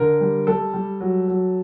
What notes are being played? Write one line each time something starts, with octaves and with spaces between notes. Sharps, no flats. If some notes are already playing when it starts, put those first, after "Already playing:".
Already playing: D3 A#4
G3
G3 A4
G3
F#3
F#3